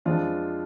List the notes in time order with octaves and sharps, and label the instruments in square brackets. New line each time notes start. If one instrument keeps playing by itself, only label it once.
[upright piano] F2 F3 G#3 D4 F4